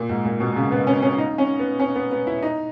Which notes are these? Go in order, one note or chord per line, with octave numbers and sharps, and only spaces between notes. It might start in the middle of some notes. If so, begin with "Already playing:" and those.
Already playing: A#2
G#2
A#2
B2
C#3
B3
C#4
C#4
D#4
C#4
B3
C#4
B3
B3
E4
D#4